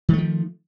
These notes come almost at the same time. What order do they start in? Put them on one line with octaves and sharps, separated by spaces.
D#3 A3 F3